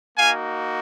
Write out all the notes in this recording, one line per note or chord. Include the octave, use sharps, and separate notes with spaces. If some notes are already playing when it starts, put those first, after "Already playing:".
A#3 D#4 F#4 F5 G#5